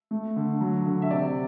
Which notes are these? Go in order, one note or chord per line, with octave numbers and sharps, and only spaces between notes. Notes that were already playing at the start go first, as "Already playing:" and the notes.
A3
D3
F#3
D3
E5
C3 D5